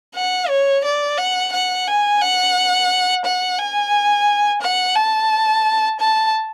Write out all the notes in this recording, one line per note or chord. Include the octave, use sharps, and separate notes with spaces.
F#5
C#5
D5
F#5
F#5
G#5
F#5
F#5
G#5
F#5
A5
A5